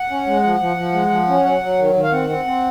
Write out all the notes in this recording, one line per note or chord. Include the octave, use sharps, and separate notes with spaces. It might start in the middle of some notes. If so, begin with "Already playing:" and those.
Already playing: F#5
C#4
G#3
F3
F3
F3
G#3
F3
C#4
F#3 F#5
F#3
D#3
D#3
F5
C4 F#5
C4
C4